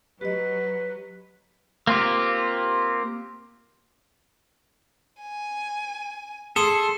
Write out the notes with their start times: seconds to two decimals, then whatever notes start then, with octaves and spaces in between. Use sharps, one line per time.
0.21 F#3 G4 B4 D#5
1.87 A#3 C4 F4 G4
5.21 G#5
6.56 G#4 A4 C6